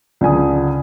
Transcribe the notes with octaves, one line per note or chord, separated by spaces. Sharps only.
C#2 D3 G#5 D#6